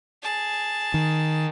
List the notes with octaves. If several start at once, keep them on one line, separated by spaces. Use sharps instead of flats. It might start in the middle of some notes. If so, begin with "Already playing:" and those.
G#4 A5
D#3